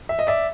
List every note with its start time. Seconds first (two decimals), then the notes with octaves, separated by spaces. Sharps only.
0.09 E5
0.19 D#5
0.27 D5 E5